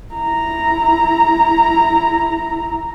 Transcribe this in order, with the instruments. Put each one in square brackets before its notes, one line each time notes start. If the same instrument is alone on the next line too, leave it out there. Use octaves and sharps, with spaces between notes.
[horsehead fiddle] E4 A#5